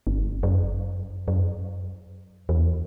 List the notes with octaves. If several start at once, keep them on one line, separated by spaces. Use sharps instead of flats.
G1
F#2
F#2
E2